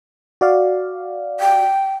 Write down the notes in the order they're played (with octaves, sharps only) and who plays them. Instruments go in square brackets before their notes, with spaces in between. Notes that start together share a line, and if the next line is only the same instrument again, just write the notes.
[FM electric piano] F#4 D5 F5
[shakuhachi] G5